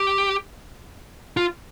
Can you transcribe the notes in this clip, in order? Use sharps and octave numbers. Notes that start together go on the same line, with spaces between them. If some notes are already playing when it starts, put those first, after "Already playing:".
Already playing: G4
F4